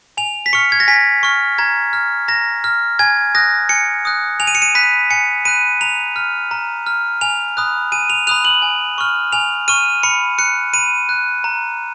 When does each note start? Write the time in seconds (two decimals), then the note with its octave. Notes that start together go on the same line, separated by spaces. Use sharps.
0.17 G#5 F7
0.46 B6
0.53 C#6 F6 C#7
0.72 G#6
0.80 A#6
0.88 G#5 B6
1.23 C#6 F6
1.58 A#5 G#6
1.93 F6
2.28 A#5 A#6
2.64 F6
2.99 G#5 G#6
3.35 D#6 F#6 A#6
3.69 G#5 C#7
4.05 D#6 F#6
4.40 G#5 F7
4.47 D#7
4.55 C#7
4.62 D#7
4.75 B5 F#6 B6
5.10 G#5 C#7
5.45 B5 F#6 D#7
5.81 A#5 F7
6.16 F6
6.51 A#5
6.86 F6
7.21 G#5 F7
7.57 B5 D#6 F#6
7.92 G#5 D#7
8.10 F7
8.27 B5 D#6 F#6 F7
8.45 F#7
8.62 G#5
8.98 C#6 F6
9.32 G#5 F7
9.68 C#6 F6 D#7
10.03 B5 C#7
10.38 F#6 C#7
10.74 B5 D#7
11.09 F#6
11.44 A#5